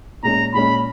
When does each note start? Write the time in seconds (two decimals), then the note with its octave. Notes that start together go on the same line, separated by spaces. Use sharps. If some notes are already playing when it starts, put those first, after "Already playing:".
0.23 A#2 G#3 C#4 A#5
0.54 A#2 G#3 C#4 B5